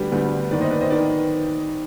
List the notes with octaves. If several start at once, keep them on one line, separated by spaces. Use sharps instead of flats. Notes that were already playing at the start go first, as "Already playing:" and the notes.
Already playing: D2 D3 G3 B3 G4 B4
D2 D3 G3 B3
D#2 D#3 B3 B4 D5
C5 D#5
B4 D5
C5 D#5
D#3 B4 D5